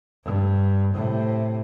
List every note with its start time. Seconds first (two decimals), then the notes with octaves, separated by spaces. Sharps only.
0.24 G2
0.93 A2 C3